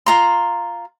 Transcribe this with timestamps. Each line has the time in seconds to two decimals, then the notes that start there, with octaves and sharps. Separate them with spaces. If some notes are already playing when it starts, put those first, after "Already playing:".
0.06 F4 A#5 C6